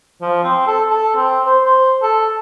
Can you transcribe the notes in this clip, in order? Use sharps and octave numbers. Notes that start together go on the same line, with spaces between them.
F3
C4
A4
A4
C4
C5
C5
A4